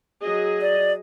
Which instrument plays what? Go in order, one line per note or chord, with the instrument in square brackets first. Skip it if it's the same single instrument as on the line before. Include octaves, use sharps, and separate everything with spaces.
[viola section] F#3 G#4 D#5
[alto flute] D5